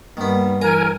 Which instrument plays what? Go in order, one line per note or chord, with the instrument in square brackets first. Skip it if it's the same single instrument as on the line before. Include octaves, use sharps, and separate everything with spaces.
[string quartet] G2 [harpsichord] D#3 B3 [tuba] A#3
[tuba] E3 [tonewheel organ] A#4 G#5 [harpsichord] A#5